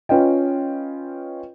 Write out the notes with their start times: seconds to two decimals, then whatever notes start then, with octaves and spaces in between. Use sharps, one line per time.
0.09 C#4 F4 B4 D#5 G5